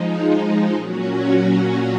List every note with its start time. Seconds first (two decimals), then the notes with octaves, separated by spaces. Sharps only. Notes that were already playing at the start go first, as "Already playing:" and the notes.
Already playing: F3 G#3 D#4
0.73 A#2 F#3 C#4 F#4